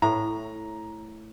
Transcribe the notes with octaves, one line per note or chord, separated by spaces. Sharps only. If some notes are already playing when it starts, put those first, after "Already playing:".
A2 A#5